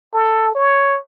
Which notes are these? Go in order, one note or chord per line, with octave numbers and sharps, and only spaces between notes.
A4
C#5